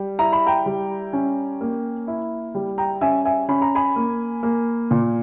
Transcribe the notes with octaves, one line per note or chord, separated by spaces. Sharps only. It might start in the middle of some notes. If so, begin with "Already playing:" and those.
Already playing: G3
E4 A#5
B5
G5 A#5
G3
C#4
A#3
E4
G3
G5 A#5
C#4 E5 G#5
E5 G#5
C#4 B5
A#5
G#5 B5
A#3
A#3
A#2